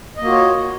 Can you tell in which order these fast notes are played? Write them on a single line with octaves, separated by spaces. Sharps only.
D#5 A#3 F#4 F4 C#5